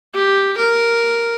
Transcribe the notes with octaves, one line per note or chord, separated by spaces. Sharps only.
G4
A#4